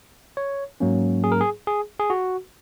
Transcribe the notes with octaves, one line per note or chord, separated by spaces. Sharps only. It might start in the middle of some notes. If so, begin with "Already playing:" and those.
C#5
G#2 F#3 A#3 C#4
G#4
A#4
G#4
G#4
G#4
F#4